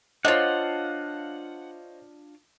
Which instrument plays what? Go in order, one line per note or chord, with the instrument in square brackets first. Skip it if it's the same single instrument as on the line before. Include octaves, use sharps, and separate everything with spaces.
[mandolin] D4 F4 [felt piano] C5 C#5 D#5 [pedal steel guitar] F#5